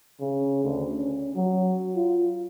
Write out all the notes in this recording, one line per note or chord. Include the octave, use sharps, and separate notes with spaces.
C#3
D2
C#4
F#3
F4